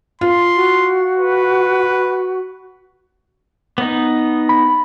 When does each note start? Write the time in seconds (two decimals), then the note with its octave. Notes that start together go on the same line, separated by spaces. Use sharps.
0.21 F4 C6
0.56 F#4
1.16 B4
3.78 B3 D#4
4.49 B5